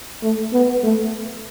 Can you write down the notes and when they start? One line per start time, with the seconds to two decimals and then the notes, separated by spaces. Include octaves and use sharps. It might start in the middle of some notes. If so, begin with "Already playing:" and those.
0.22 A3
0.53 B3
0.83 A3